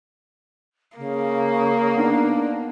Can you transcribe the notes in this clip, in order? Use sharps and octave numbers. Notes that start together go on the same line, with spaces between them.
C#3 A#3
B3 D4 D#4